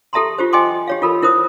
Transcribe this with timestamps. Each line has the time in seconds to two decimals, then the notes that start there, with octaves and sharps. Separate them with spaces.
0.13 G4 A4 E5 A5 A#5 C6
0.38 F4 G4 C5
0.53 D#5 G5 G#5 C6 D6
0.87 G4 C#5 F5
1.02 F4 A4 A#4 B5
1.22 E4 A#4 C5 D#6